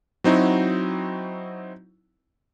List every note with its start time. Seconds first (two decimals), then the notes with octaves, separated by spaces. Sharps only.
0.24 F#3 C4 D#4 E4 F#4